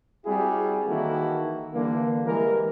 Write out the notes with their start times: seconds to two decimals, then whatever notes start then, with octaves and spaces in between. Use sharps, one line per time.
0.25 G3 C4 E4 F#4 G#4
0.87 D#3 E3 A#3 E4 F#4 A4
1.73 D3 E3 G3 A#3
2.27 E3 G3 G#3 A#4